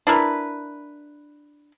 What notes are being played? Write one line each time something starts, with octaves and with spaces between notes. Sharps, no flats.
D4 E4 A#4 B4